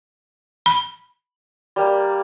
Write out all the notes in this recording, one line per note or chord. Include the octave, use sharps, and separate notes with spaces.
B5
G3 A#3